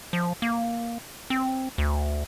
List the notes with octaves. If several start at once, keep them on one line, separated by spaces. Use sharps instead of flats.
F3
A#3
C4
D2